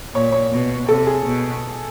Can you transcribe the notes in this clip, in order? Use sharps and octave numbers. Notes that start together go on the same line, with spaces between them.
A#2 C#5
C#5
B2
C3 A4
G#4
B2